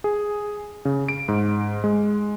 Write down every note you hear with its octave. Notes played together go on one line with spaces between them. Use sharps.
G#4
C#3
D7
G#2
G#3